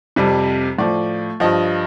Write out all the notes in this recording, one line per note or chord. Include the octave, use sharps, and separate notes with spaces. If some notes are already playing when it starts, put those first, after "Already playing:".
F2 C3 G3
A2 F3 D5
G2 F3 D#5